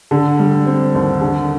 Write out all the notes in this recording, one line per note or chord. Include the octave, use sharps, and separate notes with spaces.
D3
G3
C4
D#2
D3